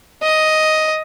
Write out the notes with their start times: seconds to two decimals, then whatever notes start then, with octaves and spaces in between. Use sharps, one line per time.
0.23 D#5